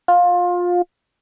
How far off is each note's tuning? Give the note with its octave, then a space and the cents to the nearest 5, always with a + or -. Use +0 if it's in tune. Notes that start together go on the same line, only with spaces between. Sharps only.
F4 +20